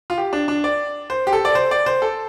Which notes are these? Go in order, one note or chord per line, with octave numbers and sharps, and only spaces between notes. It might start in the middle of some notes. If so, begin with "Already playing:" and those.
F4
G4
D4
D4
D5
C5
G4
A4
D5
C5
D5
C5
A4